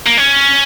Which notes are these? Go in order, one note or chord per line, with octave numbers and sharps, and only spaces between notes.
A#3
C#4